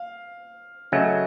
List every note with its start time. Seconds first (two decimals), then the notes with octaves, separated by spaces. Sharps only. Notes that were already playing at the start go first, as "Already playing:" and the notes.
Already playing: F5
0.92 C#3 F#3 A3 C#4 F#4 D#5